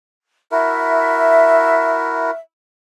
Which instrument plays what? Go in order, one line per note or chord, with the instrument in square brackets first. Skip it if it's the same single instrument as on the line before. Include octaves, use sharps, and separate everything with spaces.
[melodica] E4 F#4 A#4 [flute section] E5